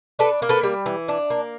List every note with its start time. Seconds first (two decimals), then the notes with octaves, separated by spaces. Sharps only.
0.19 D4 A4 B4
0.42 A#3
0.49 A4 B4
0.63 G3
0.86 E3
1.08 D4
1.30 A#3